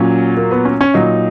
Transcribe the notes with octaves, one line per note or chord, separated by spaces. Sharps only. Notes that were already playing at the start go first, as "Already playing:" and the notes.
Already playing: A#2 F#3 C#4
A#3
B3
C#4
C#4
A#2 F#3 D#4